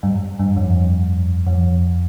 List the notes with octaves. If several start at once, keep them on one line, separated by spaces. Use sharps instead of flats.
G2
G2
F2
F2